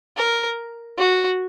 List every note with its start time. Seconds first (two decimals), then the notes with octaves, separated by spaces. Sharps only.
0.17 A#4
0.98 F#4